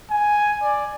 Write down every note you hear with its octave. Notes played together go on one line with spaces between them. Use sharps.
G#5
D5